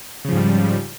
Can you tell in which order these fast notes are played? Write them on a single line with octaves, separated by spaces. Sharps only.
C#3 F3 G#2 G3